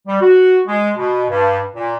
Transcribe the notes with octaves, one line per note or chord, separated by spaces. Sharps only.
G3
F#4
G#3
B2
G2
A#2